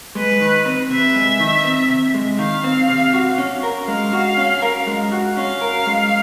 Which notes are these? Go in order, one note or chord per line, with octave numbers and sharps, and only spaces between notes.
G#3 B4
D#3
C4
C3 E5
G#3
D#3
C4
C3
G#3
D#3 F5
C4
C3
F#4
C#4
A#4
G#3 F5
F#4
C#4
A#4
G#3
F#4
C#4 F5
A#4
G#3